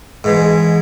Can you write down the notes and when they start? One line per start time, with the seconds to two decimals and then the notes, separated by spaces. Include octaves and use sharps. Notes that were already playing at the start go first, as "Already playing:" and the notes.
0.24 G#2 E3 G#3